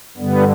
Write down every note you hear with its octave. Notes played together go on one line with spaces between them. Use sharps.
G2 D3 G3 B3